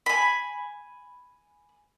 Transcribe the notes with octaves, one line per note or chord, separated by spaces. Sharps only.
G#5 B5